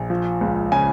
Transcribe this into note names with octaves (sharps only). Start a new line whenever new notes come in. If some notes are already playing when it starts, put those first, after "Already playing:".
Already playing: A#1
F3
C#2
C#3 G#5